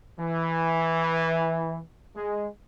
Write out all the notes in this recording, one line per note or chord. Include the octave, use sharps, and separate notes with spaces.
E3
G#3